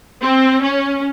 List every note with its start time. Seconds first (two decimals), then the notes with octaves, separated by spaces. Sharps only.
0.22 C4
0.61 C#4